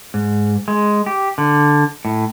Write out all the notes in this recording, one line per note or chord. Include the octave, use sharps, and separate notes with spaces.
G#2
G#3
G4
D3
A2